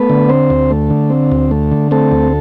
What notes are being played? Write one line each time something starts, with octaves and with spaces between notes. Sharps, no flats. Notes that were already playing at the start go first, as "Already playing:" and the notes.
Already playing: A3 B3 B4
D3
C4 C5
D2
A3
D3
C4
D2
A3
D3
A3 C4 A4
D2